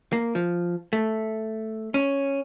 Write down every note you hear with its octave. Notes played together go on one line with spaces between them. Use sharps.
A#3
F3
A3
C#4